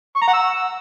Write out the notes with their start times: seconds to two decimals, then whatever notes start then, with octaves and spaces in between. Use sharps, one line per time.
0.16 C#6
0.22 A#5
0.28 F#5
0.34 E6